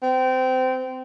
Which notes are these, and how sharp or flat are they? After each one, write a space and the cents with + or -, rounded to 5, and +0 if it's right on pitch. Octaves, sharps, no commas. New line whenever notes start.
C4 -25